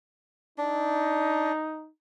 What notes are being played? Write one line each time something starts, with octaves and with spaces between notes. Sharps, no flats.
D4 D#4